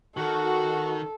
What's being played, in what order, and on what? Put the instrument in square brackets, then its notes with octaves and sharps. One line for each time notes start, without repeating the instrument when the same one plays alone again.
[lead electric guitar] D#3 [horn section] F#4 [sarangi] A4